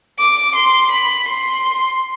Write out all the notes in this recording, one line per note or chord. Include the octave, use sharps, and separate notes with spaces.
D6
C6
B5
C6